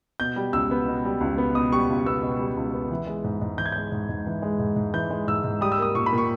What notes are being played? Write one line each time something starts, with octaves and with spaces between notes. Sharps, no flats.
B2 G6
G3
C#2 E6
B3
B2
G3
C#2
B3
B2 D#6
G3 C#6
C#2
B3 E6
B2
G3
C#2
B3
E3
G#3
G#2
G#2
E3 G6
G#6
G#3 G6
G#2
G#2
E3
G#3
G#2
G#2
E3 G6
G#3
G#2 E6
G#2
G3 D#6
E6
A#3 D#6
A#2 C#6
B5
A#2
C#6